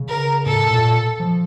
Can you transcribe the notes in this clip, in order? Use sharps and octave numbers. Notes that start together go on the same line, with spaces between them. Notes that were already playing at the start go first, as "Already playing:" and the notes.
Already playing: C#3
A#4
A2 A4
A#2
F3